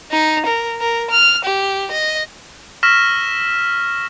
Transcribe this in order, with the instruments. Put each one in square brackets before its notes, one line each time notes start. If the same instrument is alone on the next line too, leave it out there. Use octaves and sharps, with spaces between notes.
[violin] D#4
A#4
A#4
F6
G4
D#5
[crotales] C#6 E6 F6 A#6 B6 E7